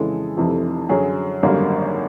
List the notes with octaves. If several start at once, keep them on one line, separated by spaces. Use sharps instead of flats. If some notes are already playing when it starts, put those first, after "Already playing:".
Already playing: F2 C#3 E3 G#3 A4
F1 F2 C3 E3
F#2 D3 F#3 G#4
G#1 F#2 D3 G3 A#3